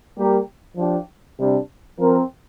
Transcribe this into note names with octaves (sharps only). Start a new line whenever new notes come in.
G3 A#3 G4 A#4
F3 D4 G4
C3 G3 D4
F3 C4 A#4